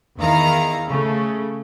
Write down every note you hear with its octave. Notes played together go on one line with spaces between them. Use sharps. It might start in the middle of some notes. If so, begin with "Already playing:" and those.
E2 D#3 E4 F5 A#5
C#3 A3